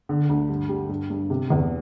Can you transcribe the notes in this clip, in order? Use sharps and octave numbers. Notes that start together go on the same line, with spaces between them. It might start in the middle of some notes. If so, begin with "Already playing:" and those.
D3
D2
G2
G3
G2
G2
C3
E2